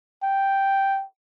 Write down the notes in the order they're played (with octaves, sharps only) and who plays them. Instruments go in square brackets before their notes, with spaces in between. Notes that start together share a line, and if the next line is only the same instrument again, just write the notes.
[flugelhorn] G5